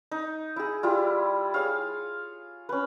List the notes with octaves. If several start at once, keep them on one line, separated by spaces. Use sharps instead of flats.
D#4
E4 G#4
G3 E4 F4
G#4 C#5 F5
C#4 B4